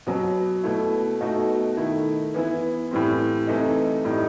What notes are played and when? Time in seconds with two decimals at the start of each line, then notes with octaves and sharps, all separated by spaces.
0.07 B2 F#3 B3
0.64 B2 A3 E4
1.21 B2 A3 D#4 F#4
1.77 D#3 A3 E4
2.34 E3 B3 E4
2.91 A2 E3 G3 C4
3.47 C3 E3 A3 D#4
4.04 A2 G3 D#4